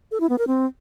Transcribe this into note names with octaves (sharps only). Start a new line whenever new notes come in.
A4
E4
B3
A#4
C4